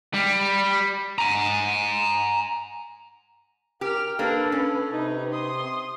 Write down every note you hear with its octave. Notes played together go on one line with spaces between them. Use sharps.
G3
G#5 A#5
G4 A#4 F6
A#3 D4 A4 B4
C#4
C3 D#4 B4
C6 D#6